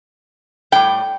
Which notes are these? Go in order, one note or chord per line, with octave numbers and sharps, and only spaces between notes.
A2 G3 G5